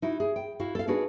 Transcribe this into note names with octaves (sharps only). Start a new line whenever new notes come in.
D#4 E4 F#4
G#4
G5
E4 F#4 F5
A4 F5
D4 D#4 F#4 G#4 B4